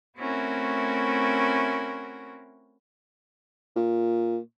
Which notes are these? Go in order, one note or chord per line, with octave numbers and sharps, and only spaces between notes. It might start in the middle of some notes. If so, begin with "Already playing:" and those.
A3 C4 C#4 E4 F#4 A#4
A#2